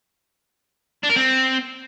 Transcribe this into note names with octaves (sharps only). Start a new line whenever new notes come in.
D4
A#4
C4